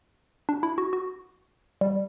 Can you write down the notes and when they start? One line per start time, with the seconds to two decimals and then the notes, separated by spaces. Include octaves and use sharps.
0.49 D4
0.63 E4
0.78 F#4
0.93 F#4
1.81 G3